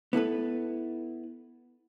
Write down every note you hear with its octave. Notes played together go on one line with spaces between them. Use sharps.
B3 E4 A4 B4